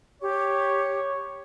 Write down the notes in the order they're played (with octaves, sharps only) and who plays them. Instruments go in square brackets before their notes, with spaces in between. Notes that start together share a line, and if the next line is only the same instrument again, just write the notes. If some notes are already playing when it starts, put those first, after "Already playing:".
[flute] G4 [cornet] C#5